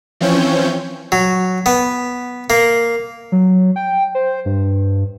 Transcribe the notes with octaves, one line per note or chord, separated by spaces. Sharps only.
E3 F3 C4 C#4 C#5 G6
F#3
B3
A#3
F#3
G5
C5
G2